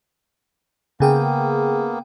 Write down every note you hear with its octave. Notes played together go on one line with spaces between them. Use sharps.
C#3 A#3 B3 G#4 G5